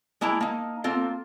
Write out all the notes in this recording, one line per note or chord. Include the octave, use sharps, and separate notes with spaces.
G#3 A#3 E4 A5 A#5
A#3 D#4
A#3 C4 F4 A4